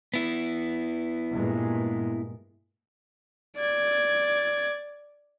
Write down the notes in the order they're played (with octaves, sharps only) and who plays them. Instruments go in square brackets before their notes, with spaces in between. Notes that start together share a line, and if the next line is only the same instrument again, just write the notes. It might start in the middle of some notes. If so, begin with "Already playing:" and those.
[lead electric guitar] B3 E4
[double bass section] G2 A#2 G#3
[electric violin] D5 G#6